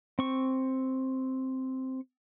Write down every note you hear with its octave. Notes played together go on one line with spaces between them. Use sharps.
C4 C#6